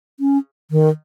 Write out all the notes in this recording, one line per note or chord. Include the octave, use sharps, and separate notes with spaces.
C#4
D#3